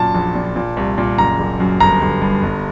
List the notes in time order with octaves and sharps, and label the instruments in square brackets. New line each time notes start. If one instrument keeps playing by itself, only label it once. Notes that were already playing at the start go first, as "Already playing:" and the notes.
Already playing: [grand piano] F#2 A#2 A5
A#1
A#2
A#2
C2
A#2
F#1 A#5
F#1
F#2
G1 A#5
G1
G2
G1